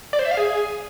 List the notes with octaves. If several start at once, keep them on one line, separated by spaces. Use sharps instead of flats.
D5
C5
E5
F5
G#4